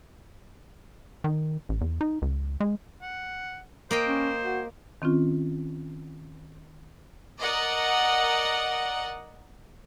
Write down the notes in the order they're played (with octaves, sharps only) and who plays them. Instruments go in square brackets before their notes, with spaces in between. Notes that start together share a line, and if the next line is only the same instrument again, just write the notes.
[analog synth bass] D#3
A1
E2
D#4
C#2
G#3
[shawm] F#5
[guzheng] A#3 D#5 G5 [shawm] C5
[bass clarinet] C#4
F#4
[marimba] D#3 C4 C#4 F4
[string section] A#4 D5 D#5 F#5